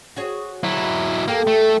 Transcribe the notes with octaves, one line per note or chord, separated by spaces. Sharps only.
F#4 G#4 C#5
F#3 E4
E2 A#3 G4 A4
A3